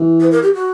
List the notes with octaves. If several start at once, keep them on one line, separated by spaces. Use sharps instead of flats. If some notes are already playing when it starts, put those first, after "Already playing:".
Already playing: E3
B4
A#4
G4
F#4